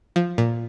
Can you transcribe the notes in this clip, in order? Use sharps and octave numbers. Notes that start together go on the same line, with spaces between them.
F3
A#2